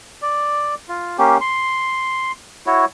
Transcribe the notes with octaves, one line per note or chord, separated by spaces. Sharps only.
D5
F4
A#3 C#4 G4
C6
E4 F#4 C#5